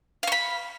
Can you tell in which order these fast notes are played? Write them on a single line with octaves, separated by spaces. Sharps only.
F5 C#6 B5